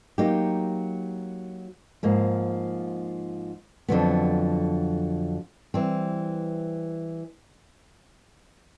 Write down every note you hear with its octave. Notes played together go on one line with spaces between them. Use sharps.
F#3 A#3 D#4 G4
G#2 F3 A#3
F2 D3 F#3 B3
E3 G3 C4